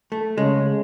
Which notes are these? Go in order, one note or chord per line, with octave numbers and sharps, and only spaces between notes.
A3
C#3 G#3